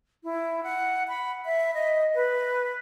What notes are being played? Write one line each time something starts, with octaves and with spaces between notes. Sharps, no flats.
E4
F#5
B5
E5
D#5
B4